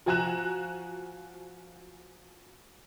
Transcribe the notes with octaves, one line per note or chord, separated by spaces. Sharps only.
F3 F#4 G#5 A#5 F#6 E7